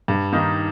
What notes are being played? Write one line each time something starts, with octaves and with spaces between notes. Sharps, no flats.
G2
D#3 A#3 D#4